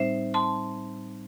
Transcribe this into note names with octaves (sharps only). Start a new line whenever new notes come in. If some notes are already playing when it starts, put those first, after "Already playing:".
Already playing: A2 G3 C4 D#4 C5 E5
A5 C6